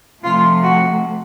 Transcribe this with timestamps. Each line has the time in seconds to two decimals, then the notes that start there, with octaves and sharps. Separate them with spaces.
0.23 C3 F3 A3 F4
0.62 F#4